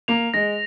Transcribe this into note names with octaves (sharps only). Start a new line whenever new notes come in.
A#3 F7
G#3 A#6